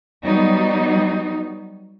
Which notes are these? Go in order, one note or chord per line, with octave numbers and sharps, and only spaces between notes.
F#3 G3 B3 D#4